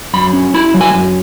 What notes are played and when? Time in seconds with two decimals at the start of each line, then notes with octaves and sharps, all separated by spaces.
0.14 F#2 B5
0.33 C#4
0.54 E4 B5
0.74 F#3
0.81 G#5
0.94 F#2